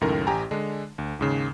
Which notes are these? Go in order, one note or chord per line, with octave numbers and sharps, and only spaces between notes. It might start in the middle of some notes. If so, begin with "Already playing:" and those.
C#2 F#2 A2 D#3 A3 A#4
A1 G4 G5 G#5 A#5
D3 G#3 D4
D2
D#2 G#2 C#3